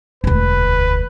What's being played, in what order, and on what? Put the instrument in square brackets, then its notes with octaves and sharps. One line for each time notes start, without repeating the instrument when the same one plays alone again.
[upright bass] E1 D2 [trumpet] B4